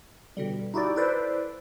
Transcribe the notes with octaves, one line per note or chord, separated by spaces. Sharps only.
B2 D3 G3
D#4 E4 F#4 G4 D5
E4 A4 B4 C5 D5